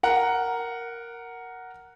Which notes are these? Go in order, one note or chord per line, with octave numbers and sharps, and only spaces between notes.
A#4 F#5